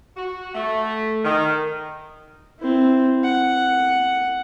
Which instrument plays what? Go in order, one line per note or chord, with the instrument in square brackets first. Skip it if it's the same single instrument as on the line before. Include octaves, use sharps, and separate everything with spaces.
[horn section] F#4
A3
D#3
[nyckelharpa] C4 E4
F#5